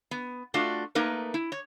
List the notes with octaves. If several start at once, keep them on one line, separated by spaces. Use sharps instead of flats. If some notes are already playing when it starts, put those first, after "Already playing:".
B3
A3 D4 F4 F#4 A4
A3 A#3 D#4 A#4 B4
E4
C#5